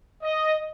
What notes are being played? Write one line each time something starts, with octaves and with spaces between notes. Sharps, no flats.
D#5